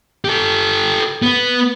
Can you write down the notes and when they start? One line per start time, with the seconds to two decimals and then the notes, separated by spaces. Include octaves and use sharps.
0.25 G4 A4
1.22 B3 B4